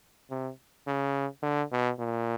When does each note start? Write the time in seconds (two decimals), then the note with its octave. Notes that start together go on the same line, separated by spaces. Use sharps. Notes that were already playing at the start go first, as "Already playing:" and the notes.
0.31 C3
0.87 C#3
1.43 D3
1.72 B2
2.00 A#2